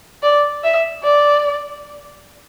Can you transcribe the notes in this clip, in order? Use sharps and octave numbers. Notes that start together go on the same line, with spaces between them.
D5
E5
D5